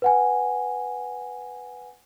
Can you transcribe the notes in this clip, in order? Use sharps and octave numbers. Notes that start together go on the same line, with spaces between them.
B4 F#5 G#5